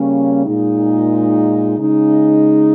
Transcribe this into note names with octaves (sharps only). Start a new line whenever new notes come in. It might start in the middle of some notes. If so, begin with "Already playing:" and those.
Already playing: C#3 G3 A#3 C#4
A#2 G#3 D#4
C#3 G#3 D#4